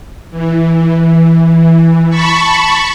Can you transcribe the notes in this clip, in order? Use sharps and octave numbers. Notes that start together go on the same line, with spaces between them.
E3
A5 B5 C#6